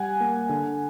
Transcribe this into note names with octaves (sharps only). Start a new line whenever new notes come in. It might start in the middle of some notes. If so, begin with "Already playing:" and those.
Already playing: G3 F#5 G#5
A#3
D3